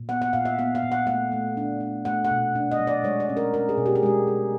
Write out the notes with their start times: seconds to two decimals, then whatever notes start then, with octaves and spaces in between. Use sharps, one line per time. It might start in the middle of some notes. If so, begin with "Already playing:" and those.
Already playing: A#2
0.09 B3 F#5
0.22 F#5
0.33 A#2 F5
0.45 E5
0.59 B3 F5
0.75 F5
0.83 A#2
0.92 F#5
1.07 A3 F5
1.32 A3
1.57 D4
1.81 D4
2.05 A3 F#5
2.25 F#5
2.31 B2
2.55 D4
2.71 D#5
2.79 F#3
2.87 D5
3.04 G#3 C#5
3.20 D5
3.29 C#4
3.37 A#4
3.54 C#4 A#4
3.69 G#4
3.77 B2
3.86 G4
3.95 G#4
4.03 G#3 G4
4.27 G#3